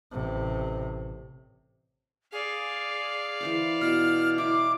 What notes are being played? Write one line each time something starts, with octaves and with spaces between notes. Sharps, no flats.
A1 C3
G#4 D5 F5
E3 C5 D6
B2 F6
E4 D6